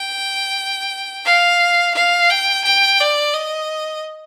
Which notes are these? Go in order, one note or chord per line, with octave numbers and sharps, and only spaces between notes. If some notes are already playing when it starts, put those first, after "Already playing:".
Already playing: G5
F5
F5
G5
G5
D5
D#5